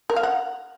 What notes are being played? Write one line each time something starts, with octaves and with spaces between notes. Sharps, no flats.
A#4
F5
F#5